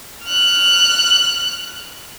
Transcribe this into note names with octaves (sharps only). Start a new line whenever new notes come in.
F6 F#6